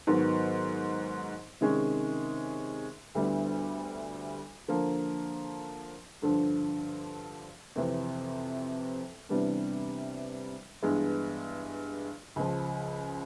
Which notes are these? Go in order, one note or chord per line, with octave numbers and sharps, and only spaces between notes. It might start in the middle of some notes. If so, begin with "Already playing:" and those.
G#2 D#3 F#3 B3
C3 D#3 G#3 C#4
D2 D3 G3 B3 E4
D3 F3 A#3
G2 D3 F3
F2 C3 E3
C3 E3 G3 B3 D4
G2 E3 G#3 B3
C#2 C#3 F3